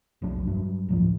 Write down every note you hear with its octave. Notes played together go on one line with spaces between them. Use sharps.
F1 B1 F#3 D4
G2 F#3
D1 A1 F3